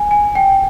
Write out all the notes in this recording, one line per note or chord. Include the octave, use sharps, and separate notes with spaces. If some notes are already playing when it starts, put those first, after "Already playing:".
Already playing: G#5
G#5
G5